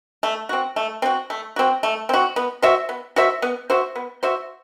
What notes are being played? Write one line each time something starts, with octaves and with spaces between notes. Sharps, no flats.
A3
C4 F#4
A3
C4 F#4
A3
C4 F#4
A3
C4 F#4
B3
F#4 C5 E5
B3
F#4 C5 E5
B3
F#4 C5 E5
B3
F#4 C5 E5